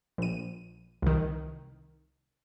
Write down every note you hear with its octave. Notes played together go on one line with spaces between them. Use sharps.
A#1 D#7
C2 D#3